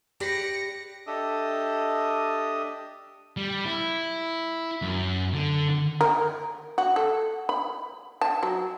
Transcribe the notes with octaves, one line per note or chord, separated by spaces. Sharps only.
G4 B4 D5 A#6 C#7
D4 G4 A4 D#5 E5 D#6
G3
E4
F#2
D3
A#4
F#4
A4
B5
A5
F#3